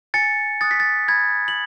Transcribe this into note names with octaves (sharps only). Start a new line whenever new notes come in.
G#5 A6 C#7
D#6 F#6 A6
B6
A6
B5 G#6
F#7